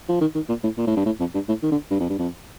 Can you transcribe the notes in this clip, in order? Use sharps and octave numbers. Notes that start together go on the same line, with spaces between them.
F3
D#3
D#3
A#2
A2
A#2
A2
G2
A2
F2
G2
A2
D#3
D3
G2
F2
G2
F2